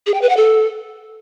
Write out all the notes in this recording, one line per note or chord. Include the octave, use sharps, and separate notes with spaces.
G#4
G5
B4
F#5
A4